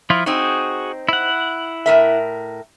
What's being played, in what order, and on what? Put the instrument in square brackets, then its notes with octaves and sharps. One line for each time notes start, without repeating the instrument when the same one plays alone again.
[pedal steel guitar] F3 E4 F4
[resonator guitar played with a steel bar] C4 D#4 [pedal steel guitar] F#4 G#4
[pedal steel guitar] E4 F#5
[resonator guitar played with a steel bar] A2 A#4 E5